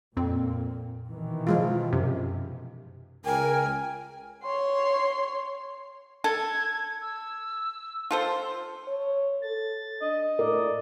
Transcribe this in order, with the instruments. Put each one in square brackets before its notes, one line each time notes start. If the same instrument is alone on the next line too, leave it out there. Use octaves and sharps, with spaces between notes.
[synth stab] F2 C4 [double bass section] A#2
[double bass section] B2 D#3 E3
[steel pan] F3 G#3 F4
[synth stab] F#2 C3
[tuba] C#2 [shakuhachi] A#4 [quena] G5 [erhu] G#5
[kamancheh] C#5 C6
[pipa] A4 [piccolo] G#6
[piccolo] E6
[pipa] F4 A4 C5
[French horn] C#5
[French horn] A4 [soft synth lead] A6
[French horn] D4 [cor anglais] D#5
[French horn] A2 [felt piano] A#4 [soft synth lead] D5